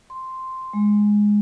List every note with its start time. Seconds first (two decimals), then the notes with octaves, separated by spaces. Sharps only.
0.10 C6
0.73 G#3